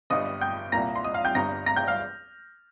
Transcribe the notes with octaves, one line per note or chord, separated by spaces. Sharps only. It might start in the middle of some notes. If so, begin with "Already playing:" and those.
G1 G2 G3 D#5 D#6
G5 G6
C2 A#2 G3 A#3 A#5 A#6
C6
D#5 D#6
F5 F6
G5 G6
G1 G2 G3 A#5 A#6
A#5 A#6
G5 G6
F5 F6